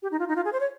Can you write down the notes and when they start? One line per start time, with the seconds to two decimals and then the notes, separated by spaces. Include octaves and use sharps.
0.02 G4
0.11 D#4
0.19 F4
0.28 D#4
0.36 F4
0.45 G#4
0.53 C5
0.60 C#5